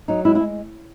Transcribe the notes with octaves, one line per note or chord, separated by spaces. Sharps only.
F#3 D#4
G#3 E4
E4
G#3